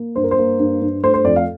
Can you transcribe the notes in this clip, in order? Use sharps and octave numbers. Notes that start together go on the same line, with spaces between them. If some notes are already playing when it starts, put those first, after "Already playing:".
Already playing: A#3
G2 C5
A#4
C5
A#3
G2
G2
A3 C5
C5
F2 D5
F5